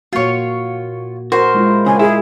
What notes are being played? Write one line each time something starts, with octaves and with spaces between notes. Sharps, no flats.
A#2 A#3 F4 F#4 C#5
F#4 A#4 C5
G#3 E4 F4
C#3 G#5
E4 G#4 E5